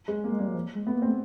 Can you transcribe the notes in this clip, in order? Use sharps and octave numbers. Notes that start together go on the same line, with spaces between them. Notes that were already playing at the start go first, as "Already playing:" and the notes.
G#3
A#3
G#3
G3 A#3
F#3
F3
G#3
A3 B3
A#3
C4
A3